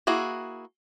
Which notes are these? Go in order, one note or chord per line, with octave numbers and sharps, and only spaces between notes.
A#3 E4 F#4 G#4